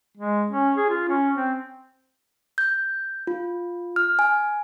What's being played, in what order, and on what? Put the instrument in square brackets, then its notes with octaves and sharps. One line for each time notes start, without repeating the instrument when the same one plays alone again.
[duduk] G#3
C#4
G#4
F4
C#4
C4
[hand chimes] G6
F4
F6
G#5